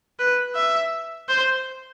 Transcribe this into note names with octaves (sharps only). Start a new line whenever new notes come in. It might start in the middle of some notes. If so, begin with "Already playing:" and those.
B4
E5
C5